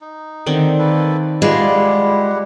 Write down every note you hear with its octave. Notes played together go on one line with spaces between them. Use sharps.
D#4
D3 D#3 C4
A#3 A4 B4
G3 G#3 E4 F4 G4 F5 F#5